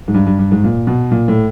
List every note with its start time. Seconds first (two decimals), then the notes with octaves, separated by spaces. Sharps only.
0.08 G#2
0.14 G2
0.26 G2
0.39 G2
0.52 G#2
0.64 A#2
0.87 B2
1.11 A#2
1.28 A2